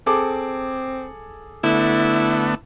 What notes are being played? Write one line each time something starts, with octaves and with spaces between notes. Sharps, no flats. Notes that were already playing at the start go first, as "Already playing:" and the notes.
C4 G#4 A4 D6
D3 A3 B3 E4